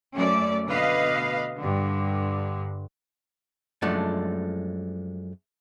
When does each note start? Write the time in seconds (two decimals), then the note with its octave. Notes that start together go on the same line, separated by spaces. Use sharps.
0.14 F#2 A3 C#4 D5
0.68 B2 D3 B4 D#5 F5
1.58 G2 D3
3.82 F#2 F3 G#3 A3 D4